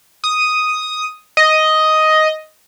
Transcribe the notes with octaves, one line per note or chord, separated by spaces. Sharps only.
D#6
D#5